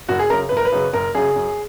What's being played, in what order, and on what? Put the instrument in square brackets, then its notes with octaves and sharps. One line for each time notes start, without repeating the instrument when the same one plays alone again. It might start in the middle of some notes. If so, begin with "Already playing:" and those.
[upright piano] F#1 F#4
G#4
F#2 A#4
C#3
F#1 B4
A#4
B4
F#2 C#3
F#1 A#4
F#2 C#3 G#4
F#2